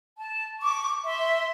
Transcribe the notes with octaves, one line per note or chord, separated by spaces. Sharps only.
A5
C#6 D6
E5 C6